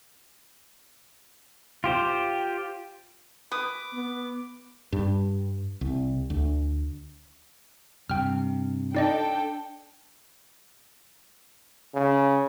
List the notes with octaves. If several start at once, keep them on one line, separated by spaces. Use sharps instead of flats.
F4 G4 C5
B4 D6 D#6
B3
G2
C2
D2
G2 C3 G5 F6
D4 D#4 A4 D5 D#5 G5
C#3